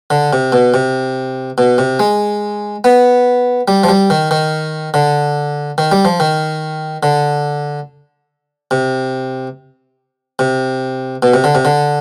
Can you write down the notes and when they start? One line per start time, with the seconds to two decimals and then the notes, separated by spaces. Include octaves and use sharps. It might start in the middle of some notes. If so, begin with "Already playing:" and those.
0.10 D3
0.33 C3
0.52 B2
0.74 C3
1.58 B2
1.78 C3
2.00 G#3
2.84 B3
3.68 G3
3.84 F3
3.89 G3
4.10 D#3
4.31 D#3
4.94 D3
5.78 D#3
5.92 G3
6.05 F3
6.20 D#3
7.03 D3
8.71 C3
10.39 C3
11.22 B2
11.34 C3
11.44 D3
11.55 C3
11.65 D3